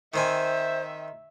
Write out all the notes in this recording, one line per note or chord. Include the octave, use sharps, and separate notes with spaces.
D#3 C4 C5 E5 G#5